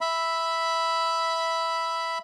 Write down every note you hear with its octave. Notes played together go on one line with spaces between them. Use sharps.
E5 B5